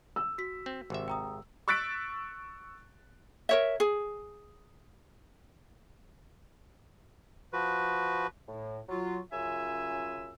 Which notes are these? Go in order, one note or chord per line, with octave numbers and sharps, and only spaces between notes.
E6
F#4 B6
C4
G#1 C3 E5
G5 A#5 D#6
C#6 E6 F#6 A6 B6 D7
A#4 C#5 E5
G#4
F3 F#4 B4
A2
F#3 F4
F#2 C#3 F4 E5 G#5 E6